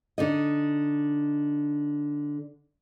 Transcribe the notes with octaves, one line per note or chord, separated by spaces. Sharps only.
D3 D#4 D#5